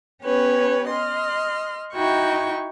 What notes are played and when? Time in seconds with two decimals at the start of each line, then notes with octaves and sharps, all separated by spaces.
0.22 B3 C#4 G4 B4 C#5
0.88 D#5 C6 F6
1.94 D#4 E4 F#4 G5 C#6